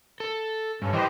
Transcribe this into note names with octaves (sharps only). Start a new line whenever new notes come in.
A4
G2 C#4 A4
E3 G4 C5 D#5